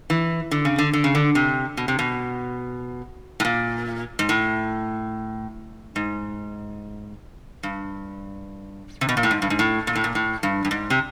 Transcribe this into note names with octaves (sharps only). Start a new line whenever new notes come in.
E3
D3
C#3
D3
D3
C#3
D3
C3
B2
C3
B2
A2
A#2
G#2
A2
G#2
G2
C3
B2
A#2
A2
G#2
G2
G#2
A2
A#2
A2
A#2
A2
G2
G2
G#2
C3